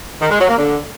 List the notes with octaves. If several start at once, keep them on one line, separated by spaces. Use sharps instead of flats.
D#3
G#3
F#3
A#3
D3